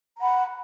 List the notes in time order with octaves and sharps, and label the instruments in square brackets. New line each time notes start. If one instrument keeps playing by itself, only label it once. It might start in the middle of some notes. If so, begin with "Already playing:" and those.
[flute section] A#5
F#5
B5